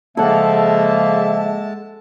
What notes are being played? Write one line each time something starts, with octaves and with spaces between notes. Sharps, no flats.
C#3 F3 G#3 A#3 A4 E5 F#5 A5